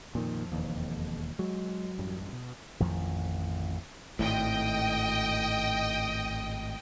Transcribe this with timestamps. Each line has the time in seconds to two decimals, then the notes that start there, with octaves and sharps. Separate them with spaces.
0.15 F2 A#2 D#3
0.52 E1 D#2
1.39 F#3 G#3
1.98 A1 F#2 G3
2.33 B2
2.80 A1 F2 D#3 F3
4.19 G#1 A2 D#5 G5